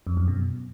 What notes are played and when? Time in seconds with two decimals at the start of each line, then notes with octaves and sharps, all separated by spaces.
0.07 F2
0.17 F#2
0.28 B2